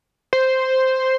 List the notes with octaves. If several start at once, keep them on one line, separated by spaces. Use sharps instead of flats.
C5